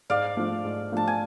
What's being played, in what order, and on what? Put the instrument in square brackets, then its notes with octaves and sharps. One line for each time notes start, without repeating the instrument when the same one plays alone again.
[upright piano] G#2 [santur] D5 F5
[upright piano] F3 A3 D4
G#2
[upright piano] F3 A3 D4 [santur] A5
[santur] G#5